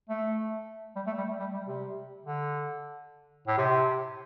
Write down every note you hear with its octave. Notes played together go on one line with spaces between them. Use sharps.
A3
G3
A3
G3
A3
G3
G3
C3
D3
A2
C3